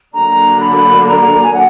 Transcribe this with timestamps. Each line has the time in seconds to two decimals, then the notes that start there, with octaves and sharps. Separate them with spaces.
0.14 D3 F#3 A#3 D4 A#5
0.61 B5
1.08 A#5
1.43 G#5
1.54 F#5